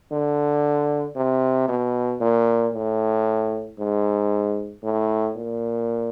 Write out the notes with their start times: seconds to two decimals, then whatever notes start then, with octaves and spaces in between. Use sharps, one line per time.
0.12 D3
1.16 C3
1.68 B2
2.21 A#2
2.74 A2
3.79 G#2
4.83 A2
5.36 A#2